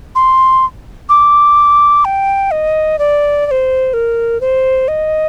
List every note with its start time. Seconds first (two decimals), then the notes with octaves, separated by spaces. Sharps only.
0.15 C6
1.09 D6
2.05 G5
2.51 D#5
2.99 D5
3.46 D5
3.51 C5
3.93 A#4
4.41 C5
4.88 D#5